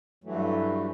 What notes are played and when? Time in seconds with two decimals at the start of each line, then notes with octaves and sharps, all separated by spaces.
0.24 G2 E3 F#3 A3